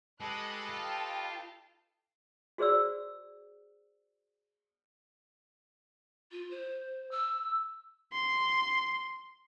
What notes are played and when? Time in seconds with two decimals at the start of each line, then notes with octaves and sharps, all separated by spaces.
0.20 G#3 G4 A4 B4 D#5 B5 D#6 F#6
0.69 F4 F5 G5 A5
2.58 F#4 G#4 C5 D5 E6
6.31 F4
6.50 C5
7.11 E6
8.13 C6